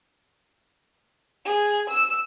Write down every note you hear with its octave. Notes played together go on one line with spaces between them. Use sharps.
G#4
E6